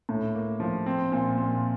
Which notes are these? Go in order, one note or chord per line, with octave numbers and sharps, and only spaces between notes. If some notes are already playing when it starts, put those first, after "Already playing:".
A2
A#3
F3
C4
A#2
A#2